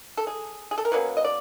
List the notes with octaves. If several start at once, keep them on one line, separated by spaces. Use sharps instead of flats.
A4
G#4
G#4
A4
A#4
B2 F#3 A#3 C#4 B4
D#5
D5